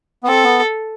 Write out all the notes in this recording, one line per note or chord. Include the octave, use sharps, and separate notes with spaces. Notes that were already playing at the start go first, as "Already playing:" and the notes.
B3
C4 A4
B3